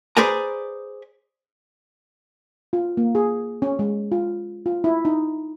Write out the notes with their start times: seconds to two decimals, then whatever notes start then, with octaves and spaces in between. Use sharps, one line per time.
0.17 G#4 B4 C5 D5 G#5 A#5
2.73 F4
2.97 A#3
3.15 G#4
3.62 C#4
3.79 G#3
4.12 F4
4.66 F4
4.84 E4
5.05 D#4